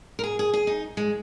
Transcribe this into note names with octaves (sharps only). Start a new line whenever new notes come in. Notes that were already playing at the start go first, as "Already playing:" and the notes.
A#4
G#4
G#4
G#4
D#4
G#3